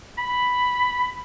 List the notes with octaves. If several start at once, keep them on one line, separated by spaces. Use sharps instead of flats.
B5